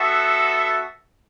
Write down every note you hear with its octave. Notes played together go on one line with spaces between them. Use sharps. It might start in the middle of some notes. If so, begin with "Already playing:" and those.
Already playing: B3 F#4 A4 E5